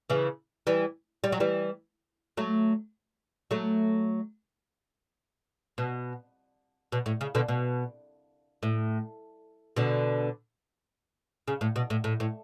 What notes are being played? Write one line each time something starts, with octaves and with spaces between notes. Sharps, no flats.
C#3 E3
E3 G3
G3
F#3
E3 G3
F#3 A3
F#3 A3
B2
B2
A2
C#3
B2 D3
B2
A2
B2 D3
C#3
A2
B2
A2
A2
A2